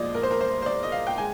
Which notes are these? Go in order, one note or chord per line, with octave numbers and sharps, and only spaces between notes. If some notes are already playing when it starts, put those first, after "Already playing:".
Already playing: A#2 F3 G#3 D5 D#5
A#4
C5
A#4
C5
C5
D5
D#5
F5
G5
G#3 G#5